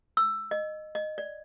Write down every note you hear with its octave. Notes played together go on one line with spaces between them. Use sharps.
E6
D#5
D#5
D5